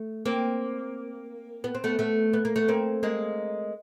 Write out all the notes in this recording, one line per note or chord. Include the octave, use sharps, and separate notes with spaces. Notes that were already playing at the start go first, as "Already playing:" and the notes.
Already playing: A3
A#3 C4
B3
C4
A3 B3
A3 B3
B3
A#3
A3 B3
A#3 C4
G#3 A#3